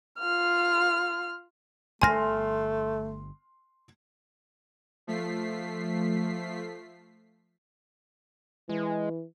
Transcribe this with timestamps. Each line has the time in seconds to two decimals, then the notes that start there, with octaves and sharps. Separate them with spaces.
0.20 F4 F6
2.02 D1 G1 A3 G#5 C6 F6 A#6
5.07 F3 A3 B6 C7
8.69 E3 G#3